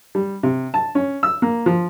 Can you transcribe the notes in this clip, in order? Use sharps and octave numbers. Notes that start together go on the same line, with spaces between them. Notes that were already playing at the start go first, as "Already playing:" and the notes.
G3
C3
A5
C#4
E6
A#3
F3